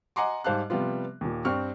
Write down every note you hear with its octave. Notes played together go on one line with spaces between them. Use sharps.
D#5 F#5 G#5 A#5 C6 D6
G#2 G3 C5 F5 A5 F#6
C3 F3 G3 B3 F4
D#2 A#2
G2 C4 G5 C#6 F6